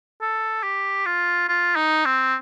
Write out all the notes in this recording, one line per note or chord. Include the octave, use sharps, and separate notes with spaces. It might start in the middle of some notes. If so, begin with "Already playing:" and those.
A4
G4
F4
F4
D#4
C4